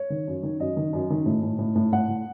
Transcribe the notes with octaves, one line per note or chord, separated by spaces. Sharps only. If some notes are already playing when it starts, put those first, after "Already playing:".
Already playing: C#5
D#3
F#2
D#3
F#2 D#5
D#3
F#2
D#3
A2
A2
A2
A2
A2 F#5
A2